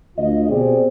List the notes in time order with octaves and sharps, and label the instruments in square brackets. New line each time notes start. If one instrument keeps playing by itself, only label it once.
[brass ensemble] D2 F4 D#5
B2 C4 G4 G#4 D5